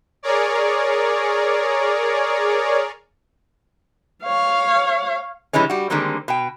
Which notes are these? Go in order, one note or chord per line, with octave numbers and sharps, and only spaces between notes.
G#4 A#4 C#5 D5
C#5 F5
C3 E3 G3 G#3 C#4
G3 F#4
D3 D#3 G3 G#3 A#3 C4
B2 G5